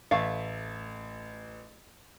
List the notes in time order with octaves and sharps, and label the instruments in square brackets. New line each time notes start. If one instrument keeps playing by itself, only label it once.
[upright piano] A1 E5 [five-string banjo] A3 F5